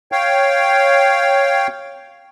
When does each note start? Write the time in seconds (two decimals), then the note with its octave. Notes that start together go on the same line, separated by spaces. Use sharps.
0.12 C#5 F5 G5